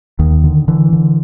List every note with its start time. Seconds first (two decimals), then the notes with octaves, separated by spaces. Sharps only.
0.19 D#2 D#3
0.44 D3
0.68 D3 E3
0.93 D3